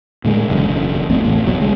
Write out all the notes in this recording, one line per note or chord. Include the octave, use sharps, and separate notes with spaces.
A2 D3 G#3
E1 C#2 F#2 D3
G#1 F2 A3 C4
D1 A1 A3
E1 B1 F#3 B3
D3 G#3